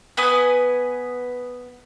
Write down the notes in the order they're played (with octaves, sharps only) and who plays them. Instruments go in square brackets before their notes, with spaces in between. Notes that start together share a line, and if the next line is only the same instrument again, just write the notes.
[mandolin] B3 B4 G#5 D#6